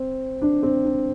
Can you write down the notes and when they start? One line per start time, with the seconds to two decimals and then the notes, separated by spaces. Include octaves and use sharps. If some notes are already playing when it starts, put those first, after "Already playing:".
Already playing: C4
0.41 D4
0.63 C4
0.84 D4